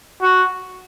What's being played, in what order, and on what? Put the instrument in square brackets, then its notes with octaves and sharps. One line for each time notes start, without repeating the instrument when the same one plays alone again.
[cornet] F#4